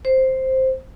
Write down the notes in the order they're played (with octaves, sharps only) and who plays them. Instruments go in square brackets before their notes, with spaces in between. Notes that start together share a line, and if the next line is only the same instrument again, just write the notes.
[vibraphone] C5